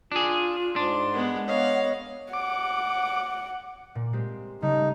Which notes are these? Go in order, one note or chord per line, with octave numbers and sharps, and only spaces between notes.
D4 F4 G#4
G#2 D4 C6
G#3 B3 F#5
B3 C#5 D#5 F5
F#5 D6
A#2
G#3 C4 G4
C#3 G3 A3 D#4